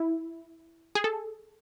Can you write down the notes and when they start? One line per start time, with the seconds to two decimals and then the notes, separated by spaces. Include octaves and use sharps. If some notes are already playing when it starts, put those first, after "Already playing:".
Already playing: E4
0.95 G#4
1.04 A4